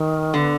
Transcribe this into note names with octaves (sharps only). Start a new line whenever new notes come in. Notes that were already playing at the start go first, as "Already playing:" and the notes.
Already playing: D#3
D3 B3